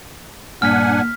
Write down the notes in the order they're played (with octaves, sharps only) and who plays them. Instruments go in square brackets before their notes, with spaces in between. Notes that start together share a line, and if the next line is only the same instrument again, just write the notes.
[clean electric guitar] G2 A#2 [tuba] A#3 [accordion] D4 F#5 G#5 [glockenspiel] F6 B6